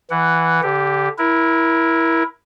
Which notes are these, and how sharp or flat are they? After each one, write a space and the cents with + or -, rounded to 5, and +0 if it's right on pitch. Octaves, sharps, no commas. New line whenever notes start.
E3 +0 F#5 +0
D3 -20 G4 +0
E4 +0 A#4 +25